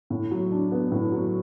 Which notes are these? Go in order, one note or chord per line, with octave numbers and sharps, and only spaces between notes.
A2
F#3
D4
B3
A2
F#3